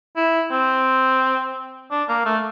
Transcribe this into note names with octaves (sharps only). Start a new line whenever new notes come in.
E4
C4
D4
A#3
A3